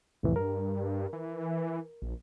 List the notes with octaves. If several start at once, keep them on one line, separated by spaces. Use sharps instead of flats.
C2 F2 A2 E3
G2 A#4
E3
A#1